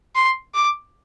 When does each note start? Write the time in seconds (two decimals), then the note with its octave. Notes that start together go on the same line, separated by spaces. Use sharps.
0.15 C6
0.54 D6